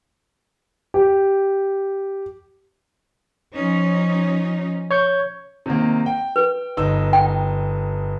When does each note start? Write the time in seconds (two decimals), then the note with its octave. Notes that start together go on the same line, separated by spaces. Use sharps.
0.94 G4
3.55 F3 C#4 D#4
4.91 C#5 C#6 G6
5.66 C3 D#3 A#3
6.06 G5
6.36 B4
6.77 G1 D#4 E6
7.13 G5